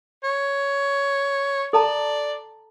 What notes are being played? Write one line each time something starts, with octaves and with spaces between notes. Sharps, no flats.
C#5
A4 D5 A5 A#5